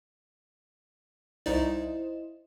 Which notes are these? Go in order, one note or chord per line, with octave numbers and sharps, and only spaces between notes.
C2 D#4 E4 C5 D5 D#5